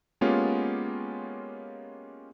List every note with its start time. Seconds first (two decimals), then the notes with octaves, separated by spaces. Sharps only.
0.21 G#3 A#3 B3 C#4 F4 G4